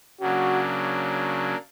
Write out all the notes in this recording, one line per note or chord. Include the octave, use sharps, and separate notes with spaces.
C#3 F#3 A#3 D4 F#4